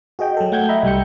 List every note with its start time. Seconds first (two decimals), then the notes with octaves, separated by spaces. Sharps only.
0.19 F#4 G#4 D#5 G5
0.37 F#3 A4
0.52 A3 F#5 G5 G6 G#6
0.69 D#5 E5 F#5 A#5 B5
0.83 C2 G3 G5 G6 C#7